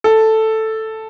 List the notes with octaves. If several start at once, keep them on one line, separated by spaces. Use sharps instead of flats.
A4